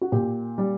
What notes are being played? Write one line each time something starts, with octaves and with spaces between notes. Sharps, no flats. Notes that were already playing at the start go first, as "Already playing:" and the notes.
F#4
A#2 G4
G3